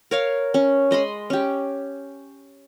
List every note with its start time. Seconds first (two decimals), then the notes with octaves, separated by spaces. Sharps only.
0.11 A#4 C#5 F5
0.54 C#4
0.91 G#3 D#5 B5 C6
1.30 C#4 G4